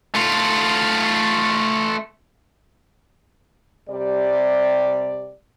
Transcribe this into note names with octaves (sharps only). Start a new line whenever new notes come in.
A3 F4
C3 G3 G4 D5